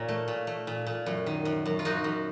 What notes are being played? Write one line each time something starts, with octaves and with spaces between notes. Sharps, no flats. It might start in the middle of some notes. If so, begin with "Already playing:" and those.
Already playing: A#2 A#4 C#5
A3
A#2
A3
A#2
A#2
F#2
D#3
F#2
F#2
F4
F#2 D#4 F#4
F#2